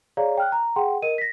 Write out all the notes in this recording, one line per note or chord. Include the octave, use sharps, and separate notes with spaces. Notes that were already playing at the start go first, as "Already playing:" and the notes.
G#4 C#5 D5 F5 A#5
G5 F6 F#6
A#5
G#4 F#5 G5 C6
A#4 D#5 D#7
A#6 B6